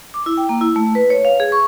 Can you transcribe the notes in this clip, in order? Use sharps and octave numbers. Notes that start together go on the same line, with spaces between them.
D6
E4
G5
A#3
E4
A3
B4
C#5
F5
G#4
C#6